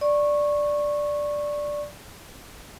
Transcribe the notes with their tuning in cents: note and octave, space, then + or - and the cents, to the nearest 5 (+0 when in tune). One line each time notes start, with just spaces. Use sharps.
D5 +0 C#6 -15